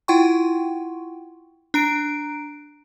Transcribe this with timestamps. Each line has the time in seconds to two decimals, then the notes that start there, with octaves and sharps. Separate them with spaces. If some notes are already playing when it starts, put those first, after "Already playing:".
0.08 E4 F4 F#5 G5 C6 C#6
1.74 D4 A#5 D7